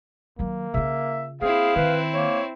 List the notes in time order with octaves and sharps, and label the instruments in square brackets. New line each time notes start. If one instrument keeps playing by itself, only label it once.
[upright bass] D#3 F#3 [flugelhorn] A#3
[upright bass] C#3 F4 [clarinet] E5
[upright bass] A#3 [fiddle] C4 E4 [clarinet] G#4 [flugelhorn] F5
[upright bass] D#3 [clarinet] B4
[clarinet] A#3 [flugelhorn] C#5